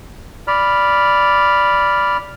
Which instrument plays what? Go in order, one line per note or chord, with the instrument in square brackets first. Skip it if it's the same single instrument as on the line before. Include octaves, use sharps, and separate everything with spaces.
[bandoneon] D5 B5 F6